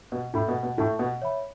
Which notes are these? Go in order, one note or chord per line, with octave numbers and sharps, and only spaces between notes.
B2
A2 A4 E5 B5
B2
B2
A2 E4 A4 E5 A5 C#6
B2
C#5 E5 B5